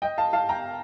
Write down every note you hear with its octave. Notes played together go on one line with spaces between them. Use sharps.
D#5 G5
F5 A5
F5 A5
G5 A#5